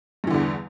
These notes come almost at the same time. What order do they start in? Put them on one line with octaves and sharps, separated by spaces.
G2 E3 D3 E2